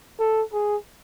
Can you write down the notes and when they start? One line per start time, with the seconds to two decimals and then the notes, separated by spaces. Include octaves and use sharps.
0.19 A4
0.53 G#4